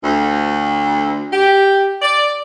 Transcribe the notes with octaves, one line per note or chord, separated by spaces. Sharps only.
D2
G4
D5